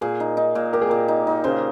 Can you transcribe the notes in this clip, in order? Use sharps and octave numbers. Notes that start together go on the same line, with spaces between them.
A#2 G#4
D#4
D#4
A#2
G4 A#4
G#4
A#2 A#4
D#4
D#4
C#3 C5